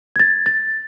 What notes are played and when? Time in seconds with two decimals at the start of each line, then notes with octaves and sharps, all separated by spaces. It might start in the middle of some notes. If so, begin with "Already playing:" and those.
0.16 G#6 A6
0.46 A6